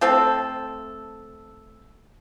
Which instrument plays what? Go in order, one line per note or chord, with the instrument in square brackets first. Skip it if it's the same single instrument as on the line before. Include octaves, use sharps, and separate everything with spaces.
[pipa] A3 C4 A4